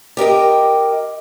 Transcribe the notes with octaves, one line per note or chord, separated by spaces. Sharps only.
G4 A#4 D#5 G5